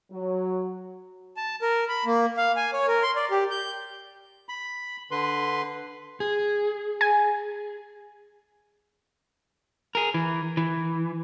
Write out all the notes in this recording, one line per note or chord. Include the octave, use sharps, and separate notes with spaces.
F#3
A5
A#4
B5
A#3
F5
G#5
C#5
A#4
C6
D5
G4
G6
B5
D3 B4 C6
G#4
G#5
G#4 A#4
E3
E3